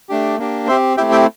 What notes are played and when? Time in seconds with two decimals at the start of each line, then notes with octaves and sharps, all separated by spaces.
0.09 A3 D4 G4
0.38 A#3 D4 G4
0.67 C4 G4 C5 E5
0.97 A3 C4 E4 G4 E5 G5
1.12 E5 G5